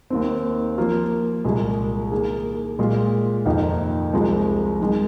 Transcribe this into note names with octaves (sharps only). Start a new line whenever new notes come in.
D#2 D#3 C4
F3 A#3 F4 A#4
C2 A#2 G#3 F4 G#4
D#3 A#3 G#4
A#2 G#3 F4
F2 C3 D#3 A#3 D#4
C2 C3 F3 G#3
G#2 D#3 G#3